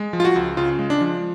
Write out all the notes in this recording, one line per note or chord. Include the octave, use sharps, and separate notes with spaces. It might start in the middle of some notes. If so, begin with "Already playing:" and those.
Already playing: G#3
F3
F4
F#4
C#2
C#3 F4
G#3
D4
F3